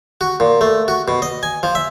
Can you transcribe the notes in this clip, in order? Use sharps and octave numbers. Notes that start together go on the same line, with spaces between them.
F#4
A#2
A3
F#4
B2
D#5
G#5
F3
E5